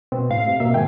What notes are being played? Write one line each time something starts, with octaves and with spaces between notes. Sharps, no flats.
B2 C4
A2 F5
C3
B2 A#3 E5
G#2 D#3 G5 G#5